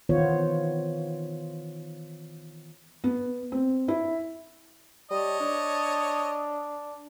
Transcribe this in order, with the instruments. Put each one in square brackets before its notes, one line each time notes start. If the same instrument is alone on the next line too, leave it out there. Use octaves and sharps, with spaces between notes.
[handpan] D#3 E3 B3 F4 C5 C#5
[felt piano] B3
C4
E4
[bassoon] G3 [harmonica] C#5 D#5 A5
[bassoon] D4